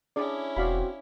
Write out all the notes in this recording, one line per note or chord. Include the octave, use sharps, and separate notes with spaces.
C#4 D4 E4 G#4 D5
E1 C4 F#4 D5 F5 B5